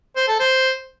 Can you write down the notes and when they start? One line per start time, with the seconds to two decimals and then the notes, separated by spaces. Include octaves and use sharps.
0.16 C5
0.28 A4
0.40 C5